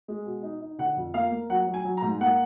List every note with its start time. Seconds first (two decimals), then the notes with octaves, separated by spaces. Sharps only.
0.08 G#3
0.25 B2
0.43 D#4
0.61 D#4
0.78 D3 F#5
0.96 F2
1.14 A#3 F5
1.31 A#3
1.49 F#3 F#5
1.67 F#3
1.74 G#5
1.85 F#3
1.97 A#5
2.02 G#2
2.20 A#3 F#5